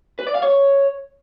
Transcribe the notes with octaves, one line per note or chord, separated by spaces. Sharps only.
B4
D5
F5
C#5